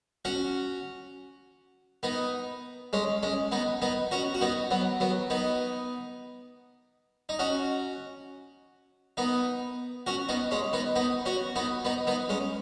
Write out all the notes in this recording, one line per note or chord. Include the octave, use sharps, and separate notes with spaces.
C#4 F#4
B3 D#4
G#3 C#4
G#3 C#4
B3 D#4
B3 D#4
C#4 F#4
F#4
B3 D#4
F#3 B3
F#3 B3
B3 D#4
D#4
C#4 F#4
B3 D#4
C#4 F#4
B3 D#4
G#3 C#4
B3 D#4
B3 D#4
C#4 F#4
B3 D#4
B3 D#4
B3 D#4
G#3 C#4